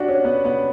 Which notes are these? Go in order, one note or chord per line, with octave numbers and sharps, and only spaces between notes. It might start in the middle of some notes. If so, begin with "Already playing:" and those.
Already playing: D4 F#4 G4
C#4
B3
B3